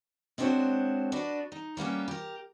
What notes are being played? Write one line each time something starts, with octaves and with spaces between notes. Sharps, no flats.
G#3 C4 D4 F#4 C5 C#5
D4 F#4 B4 D5 D#5
D#4
G3 A#3 B3 C#4
G4 A#4